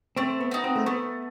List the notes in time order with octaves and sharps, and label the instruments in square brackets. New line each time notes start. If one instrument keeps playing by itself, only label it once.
[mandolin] A3 [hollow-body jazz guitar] C4
[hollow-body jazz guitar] B3
[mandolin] D#4 F#4
[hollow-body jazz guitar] C4
A3
[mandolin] A3 [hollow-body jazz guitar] B3